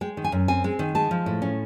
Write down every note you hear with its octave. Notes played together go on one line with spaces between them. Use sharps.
G#3 G5
D#3
G#5
F#2
C4 G#5
G#3
D#3
G#3 A5
F3
A2
C#4